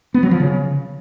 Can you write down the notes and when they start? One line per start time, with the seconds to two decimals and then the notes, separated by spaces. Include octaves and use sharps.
0.14 B3
0.23 F#3
0.31 F3
0.40 C#3